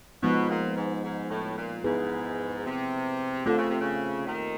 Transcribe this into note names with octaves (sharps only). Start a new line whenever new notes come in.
B2 F3 G#3 B3 D#4
A#2
G#2
G#2
A2
A#2
G#2 B3 E4 G#4 B4
C3
D3 A3 C4 F4 A4
C#3
C3
C#3
D#2 D#3